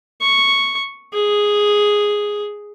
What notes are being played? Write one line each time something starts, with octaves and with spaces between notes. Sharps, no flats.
C#6
G#4